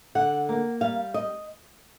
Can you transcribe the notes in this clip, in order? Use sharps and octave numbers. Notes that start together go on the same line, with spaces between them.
D3 F#5
A#3
G3 F5
D#5